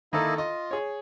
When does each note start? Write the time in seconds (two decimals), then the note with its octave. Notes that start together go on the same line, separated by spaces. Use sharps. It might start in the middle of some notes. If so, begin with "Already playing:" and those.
0.13 D#3 A#3 E4 A4 D#5
0.38 F4 D#5
0.71 G#4 C#5